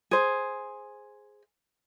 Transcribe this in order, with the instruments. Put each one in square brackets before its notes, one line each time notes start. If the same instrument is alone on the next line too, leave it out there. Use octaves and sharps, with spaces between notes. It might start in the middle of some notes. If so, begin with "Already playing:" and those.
[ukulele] G#4 C5